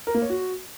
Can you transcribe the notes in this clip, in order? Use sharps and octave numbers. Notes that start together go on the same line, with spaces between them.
A#4
A#3
C#5
F#4